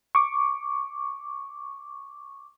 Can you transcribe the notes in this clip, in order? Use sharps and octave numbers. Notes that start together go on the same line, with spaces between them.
C#6 D6